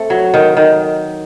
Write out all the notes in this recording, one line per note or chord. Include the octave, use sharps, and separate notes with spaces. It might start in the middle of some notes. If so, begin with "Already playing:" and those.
Already playing: A3 C4
F#3
D#3
D#3